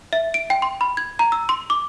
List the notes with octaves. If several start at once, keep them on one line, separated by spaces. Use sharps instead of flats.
E5
D7
G5
C6
B5
G#6
A#5
E6
C6
D6